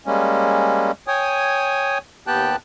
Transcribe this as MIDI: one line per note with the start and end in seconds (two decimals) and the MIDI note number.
0.06 0.91 55
0.06 0.91 56
0.06 0.91 58
0.06 0.91 61
1.07 1.98 73
1.07 1.98 79
1.07 1.98 80
1.07 1.98 87
2.27 2.56 39
2.27 2.56 59
2.27 2.56 67
2.27 2.56 79
2.27 2.56 81
2.27 2.56 90